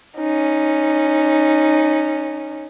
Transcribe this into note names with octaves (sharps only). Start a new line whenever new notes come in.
C#4 D#4